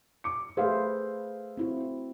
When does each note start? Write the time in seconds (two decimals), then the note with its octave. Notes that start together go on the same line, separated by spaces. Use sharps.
0.24 D6 C#7
0.57 A3 G#4 B4 C5 E5 F5
1.57 C4 E4 F#4